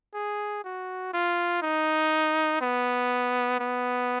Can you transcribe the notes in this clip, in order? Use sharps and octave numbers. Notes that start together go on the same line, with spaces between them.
G#4
F#4
F4
D#4
B3
B3